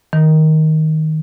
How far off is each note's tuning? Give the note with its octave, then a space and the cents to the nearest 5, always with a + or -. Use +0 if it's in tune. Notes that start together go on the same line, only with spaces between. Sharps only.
D#3 +10